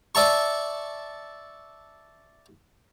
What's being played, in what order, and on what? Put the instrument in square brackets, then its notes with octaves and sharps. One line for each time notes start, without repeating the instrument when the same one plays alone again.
[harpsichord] D5 E5 A5 C#6